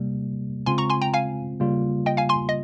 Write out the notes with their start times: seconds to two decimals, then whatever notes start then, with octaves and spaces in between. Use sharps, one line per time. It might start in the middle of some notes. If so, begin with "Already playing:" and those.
Already playing: C3 G3 A#3
0.66 C#3 G#3 C4 F4 G#5 C6
0.78 A#5 C#6
0.90 G#5 C6
1.02 G5 A#5
1.14 F5 G#5
1.60 C#3 G3 A#3 F4
2.06 D#5 G5
2.17 F5 G#5
2.29 G#5 C6
2.49 D#5